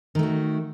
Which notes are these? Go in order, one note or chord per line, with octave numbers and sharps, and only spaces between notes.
D#3 A3 F#4